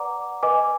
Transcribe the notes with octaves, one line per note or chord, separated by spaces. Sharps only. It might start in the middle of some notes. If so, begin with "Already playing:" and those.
Already playing: B4 D5 F#5 A#5 D6
B4 D#5 G#5 D6